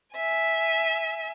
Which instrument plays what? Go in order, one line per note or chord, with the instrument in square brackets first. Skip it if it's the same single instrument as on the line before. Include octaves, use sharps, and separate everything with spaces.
[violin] E5 G#5